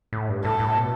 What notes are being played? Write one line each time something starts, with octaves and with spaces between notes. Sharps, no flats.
A2
G2
A2 A4
A2
B2